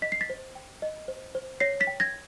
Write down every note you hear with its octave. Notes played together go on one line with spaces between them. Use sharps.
D#5 B6
C7
A6 B6
C5
G5
D#5
C5
C5
C#5 A#6 C7
A6 B6
G5
G#6 A#6